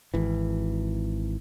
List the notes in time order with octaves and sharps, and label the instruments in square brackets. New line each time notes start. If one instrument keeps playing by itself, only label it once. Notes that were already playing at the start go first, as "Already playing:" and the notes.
[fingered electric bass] G#1 E3